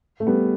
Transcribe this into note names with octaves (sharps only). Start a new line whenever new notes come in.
A3
G3 B3